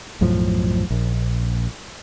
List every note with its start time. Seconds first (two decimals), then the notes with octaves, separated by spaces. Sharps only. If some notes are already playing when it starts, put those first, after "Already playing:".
0.21 B1 F#2 A2 F3
0.90 A#1